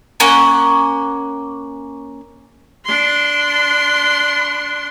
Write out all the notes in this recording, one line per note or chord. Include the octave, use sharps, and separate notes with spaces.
A#3 C#4 F#5
D4 C6